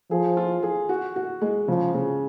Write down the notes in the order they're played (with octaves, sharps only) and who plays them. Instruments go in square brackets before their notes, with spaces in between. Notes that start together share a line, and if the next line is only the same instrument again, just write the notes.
[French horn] F3 [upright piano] G#4
[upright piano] F4
G#4
F#4
F#4
G#3
[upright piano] C#3 [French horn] F3
[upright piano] C#3